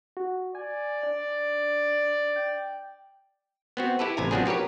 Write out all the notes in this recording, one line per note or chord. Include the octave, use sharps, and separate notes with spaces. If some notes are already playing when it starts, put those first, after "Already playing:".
F#4
D5 G#5
D4
G5
B3 C4 F#4
E4 G4 A4 B4
A1 C3 G#5 A#5
F3 F#3 B3 C4 D4 G#4
F#4 G4 A#4 B4 C#5